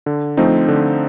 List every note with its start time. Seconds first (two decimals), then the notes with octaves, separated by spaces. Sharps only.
0.06 D3
0.37 F3 A3 C4 D#4
0.68 D3